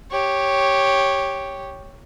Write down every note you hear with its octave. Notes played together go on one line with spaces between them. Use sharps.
G4 C#5